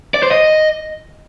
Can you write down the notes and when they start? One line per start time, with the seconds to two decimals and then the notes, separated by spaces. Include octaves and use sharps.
0.14 D5
0.23 C5
0.31 D#5